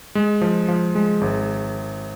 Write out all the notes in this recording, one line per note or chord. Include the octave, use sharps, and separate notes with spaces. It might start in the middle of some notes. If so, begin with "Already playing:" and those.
G#3
F3
F3
G#3
G#1